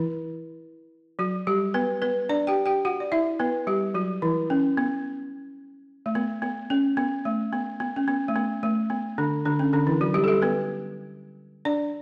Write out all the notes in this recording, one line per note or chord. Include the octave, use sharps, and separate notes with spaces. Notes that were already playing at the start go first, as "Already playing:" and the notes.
Already playing: E3 E4
F#3 F#4
G3 G4
B3 B4
B3 B4
D4 D5
G4 G5
G4 G5
F#4 F#5
D5
E4 E5
B3 B4
G3 G4
F#3 F#4
E3 E4
C#4
B3
A3
B3
B3
C#4
B3
A3
B3
B3
C#4
B3
A3
B3
A3
B3
D3 D4
D3 D4
C#4
D3 D4
E3 E4
F#3 F#4
G3 G4
A4
G3 G4
B3 B4
D4 D5